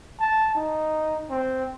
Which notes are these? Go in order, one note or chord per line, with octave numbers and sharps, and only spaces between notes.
A5
D#4
C4